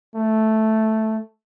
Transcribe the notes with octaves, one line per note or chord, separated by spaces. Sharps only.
A3